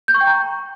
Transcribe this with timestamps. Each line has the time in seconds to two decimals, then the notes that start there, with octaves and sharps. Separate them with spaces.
0.08 G6
0.14 C#6
0.21 G5
0.27 A#5